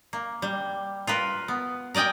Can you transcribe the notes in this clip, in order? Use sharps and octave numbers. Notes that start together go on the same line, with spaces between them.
A#3
G3
F4 A#4 B4
B3
A#4 D5 D#5 G5 G#5